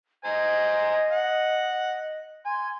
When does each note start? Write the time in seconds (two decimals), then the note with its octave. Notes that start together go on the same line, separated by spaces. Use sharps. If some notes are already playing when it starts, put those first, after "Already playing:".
0.25 C5 D#5 G#5 A#5
1.11 F#5
2.46 G#5 C6